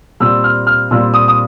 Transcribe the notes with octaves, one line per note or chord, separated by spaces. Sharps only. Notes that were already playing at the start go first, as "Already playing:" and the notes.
A#2 G3 C4 E6
F6
F6
A#2 G3 C4 E6
D#6
D#6